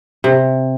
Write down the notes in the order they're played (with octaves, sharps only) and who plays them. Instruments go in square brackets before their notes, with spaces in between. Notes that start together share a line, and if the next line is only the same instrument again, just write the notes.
[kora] C3